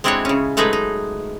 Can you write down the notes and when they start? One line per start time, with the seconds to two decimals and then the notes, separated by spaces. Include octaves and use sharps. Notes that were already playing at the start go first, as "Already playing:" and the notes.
0.04 G#3 C4 D4 E4 F#4 C#5
0.25 C#3 C#4
0.57 F#3 G#3 A3 D#4 G#4 B4
0.73 D#4